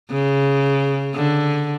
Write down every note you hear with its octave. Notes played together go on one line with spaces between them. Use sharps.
C#3
D3